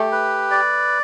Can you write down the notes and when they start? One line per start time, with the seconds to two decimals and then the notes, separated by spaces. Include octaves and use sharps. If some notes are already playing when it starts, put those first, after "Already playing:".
Already playing: A3 G4
0.12 B4
0.51 D5